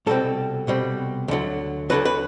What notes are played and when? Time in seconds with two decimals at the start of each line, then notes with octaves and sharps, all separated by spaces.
0.06 C2 B2 G3 C4 A4
0.67 C2 B2 G3 C4
1.28 D2 D3 F#3
1.90 D2 D3 F#3 B4
2.05 B4